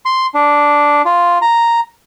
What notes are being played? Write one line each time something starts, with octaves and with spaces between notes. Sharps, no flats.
C6
D4
F4
A#5